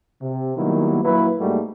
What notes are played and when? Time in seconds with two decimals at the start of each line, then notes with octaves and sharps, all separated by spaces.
0.22 C3
0.57 D#3 F#3 G3 A#3 B3 E4
1.04 A#1 F#3 A#3 E4 B4
1.40 G#2 G3 A3 A#3 D#4 F#4